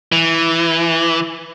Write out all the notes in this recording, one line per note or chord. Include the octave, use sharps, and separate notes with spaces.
E3